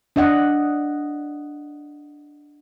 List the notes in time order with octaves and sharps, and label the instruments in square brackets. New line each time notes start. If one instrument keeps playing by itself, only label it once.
[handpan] D4 D#5 F#5